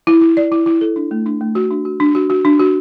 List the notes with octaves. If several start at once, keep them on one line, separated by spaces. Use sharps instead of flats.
E4
E4
D5
E4
E4
A4
D4
A3
D4
A3
F#4
D4
F#4
D4
F#4
F#4
D4
F#4